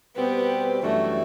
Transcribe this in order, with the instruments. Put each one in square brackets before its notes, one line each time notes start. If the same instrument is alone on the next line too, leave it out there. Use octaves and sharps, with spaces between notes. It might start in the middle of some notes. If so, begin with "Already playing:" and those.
[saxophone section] B2 G3 C4 G4 B4 [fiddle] B3
[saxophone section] F#2 E3 G3 D4 F#4 [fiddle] A3